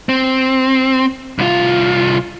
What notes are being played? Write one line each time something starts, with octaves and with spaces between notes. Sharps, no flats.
C4
C2 F4